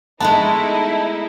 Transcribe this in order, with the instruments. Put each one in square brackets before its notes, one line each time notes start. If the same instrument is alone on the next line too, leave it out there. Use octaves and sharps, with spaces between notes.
[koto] G#3 A3 B3 [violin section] D#4 E4 [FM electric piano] A5